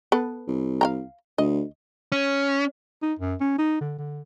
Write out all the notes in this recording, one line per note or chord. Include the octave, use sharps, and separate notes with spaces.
B3 A4 B4
C2
F5 G5 A#5
D2 D#5
C#4
D#4
F#2
C#4
D#4
D3
D3